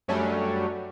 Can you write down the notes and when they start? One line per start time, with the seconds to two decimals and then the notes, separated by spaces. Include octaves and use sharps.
0.08 F#2 F#3 G3 A3 C#4 D4